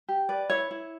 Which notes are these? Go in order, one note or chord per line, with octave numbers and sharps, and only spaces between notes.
G4
B4 D5
E4 C#5
E4